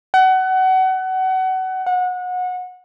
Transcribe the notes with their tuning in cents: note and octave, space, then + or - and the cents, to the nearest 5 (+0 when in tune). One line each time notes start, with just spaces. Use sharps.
F#5 +25
F#5 -25